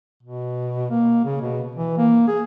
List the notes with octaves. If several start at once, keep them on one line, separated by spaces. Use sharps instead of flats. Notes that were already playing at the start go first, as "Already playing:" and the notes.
B2
A#3
C#3
B2
E3
A#3
G#4